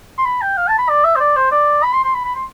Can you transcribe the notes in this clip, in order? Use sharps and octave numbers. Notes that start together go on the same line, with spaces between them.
C6
B5
G5
F5
A5
B5
D5
E5
C5
D5
C5
D5
B5
C6
C6
B5
B5
C6